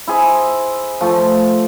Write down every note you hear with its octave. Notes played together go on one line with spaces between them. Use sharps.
E4 G#4 C5
F3 A3